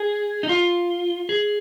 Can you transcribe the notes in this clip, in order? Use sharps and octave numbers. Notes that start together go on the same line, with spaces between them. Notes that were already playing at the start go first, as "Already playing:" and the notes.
Already playing: G#4
D#4
F4
G#4